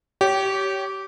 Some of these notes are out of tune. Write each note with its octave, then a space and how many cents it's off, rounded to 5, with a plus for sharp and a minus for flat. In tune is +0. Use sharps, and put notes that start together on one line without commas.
G4 -20 C#5 +15